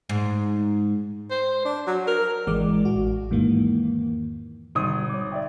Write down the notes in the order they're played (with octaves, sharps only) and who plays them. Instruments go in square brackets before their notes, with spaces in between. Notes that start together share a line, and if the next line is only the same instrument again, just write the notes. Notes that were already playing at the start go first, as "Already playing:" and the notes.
[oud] G#2
[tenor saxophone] C5
D4
F#3
A#4
[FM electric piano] G#1 E3 G#3 D5 D6
A1 F#4
E2 G#2 D#3 E3 A#3
[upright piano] G#1 D#6 [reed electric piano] B2 D3 G3
[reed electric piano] C#5 D6
D5 E5 G5